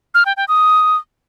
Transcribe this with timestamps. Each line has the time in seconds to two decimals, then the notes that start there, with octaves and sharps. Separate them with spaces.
0.14 F6
0.26 G5
0.37 G5
0.48 D#6